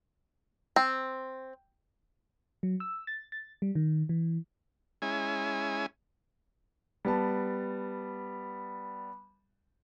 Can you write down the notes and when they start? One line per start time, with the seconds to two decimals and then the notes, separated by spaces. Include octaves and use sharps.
0.76 C4
2.63 F#3
2.80 E6
3.07 A6
3.32 A6
3.62 G3
3.75 D#3
4.09 E3
5.02 G#3 C#4 E4 G#5
7.05 G3 B3 A5